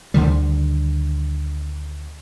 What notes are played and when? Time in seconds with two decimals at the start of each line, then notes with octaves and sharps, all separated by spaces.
0.14 D2 D3 D#3 G3